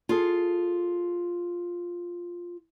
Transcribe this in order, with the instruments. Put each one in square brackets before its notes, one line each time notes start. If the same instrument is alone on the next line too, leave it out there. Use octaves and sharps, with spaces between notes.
[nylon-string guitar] F4 G#4 A4